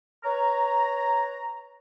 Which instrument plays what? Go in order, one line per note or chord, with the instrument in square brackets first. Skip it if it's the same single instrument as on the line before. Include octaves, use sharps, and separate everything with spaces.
[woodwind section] B4 C#5 A#5